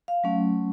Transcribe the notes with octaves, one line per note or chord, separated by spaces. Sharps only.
F5
F#3 A3 C#4